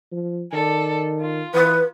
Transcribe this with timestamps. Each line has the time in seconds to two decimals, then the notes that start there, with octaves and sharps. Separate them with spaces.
0.12 F3
0.53 D#3 A4 D5
1.19 F4
1.54 E3 B4